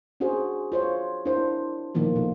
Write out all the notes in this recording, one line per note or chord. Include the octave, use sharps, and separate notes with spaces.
C#4 D4 F#4 G#4 C5
F4 C5 C#5
D4 E4 A#4 C5
A#2 D#3 F3 A#3 F4
B2 A4